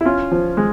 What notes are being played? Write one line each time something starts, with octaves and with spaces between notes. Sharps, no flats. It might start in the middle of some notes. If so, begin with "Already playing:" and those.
E4
C#4 F4
F3
G#3